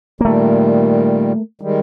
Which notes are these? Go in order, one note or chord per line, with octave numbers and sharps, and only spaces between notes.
A#2 D#3 G3 A3 A#3
D#3 G3 G#3